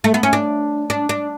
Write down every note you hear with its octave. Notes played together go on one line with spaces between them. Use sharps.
A3
B3
C#4
D4
D4
D4